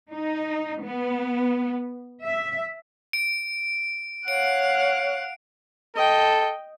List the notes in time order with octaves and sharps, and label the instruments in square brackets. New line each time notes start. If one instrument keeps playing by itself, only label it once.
[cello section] D#4
B3
E5
[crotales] D7
[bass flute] C#5 [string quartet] F5 F#5 F#6 [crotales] D7
[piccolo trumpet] A4 [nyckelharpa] D#5 G5